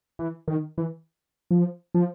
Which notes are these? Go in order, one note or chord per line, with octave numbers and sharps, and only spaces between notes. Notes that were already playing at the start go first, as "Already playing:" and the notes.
E3
D#3
E3
F3
F3